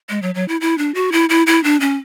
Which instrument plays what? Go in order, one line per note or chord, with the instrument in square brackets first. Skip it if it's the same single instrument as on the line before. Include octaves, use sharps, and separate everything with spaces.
[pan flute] G#3
F#3
F#3
E4
E4
D4
F#4
E4
E4
E4
D4
C#4